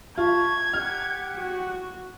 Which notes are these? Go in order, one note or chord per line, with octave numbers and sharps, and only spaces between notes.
F4 E5 A5 C#6 G#6
G4 F#5 F6 F#6
F#4